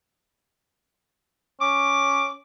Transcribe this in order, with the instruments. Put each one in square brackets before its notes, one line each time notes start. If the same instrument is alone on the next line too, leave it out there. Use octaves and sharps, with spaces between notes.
[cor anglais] C#4 [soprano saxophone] D6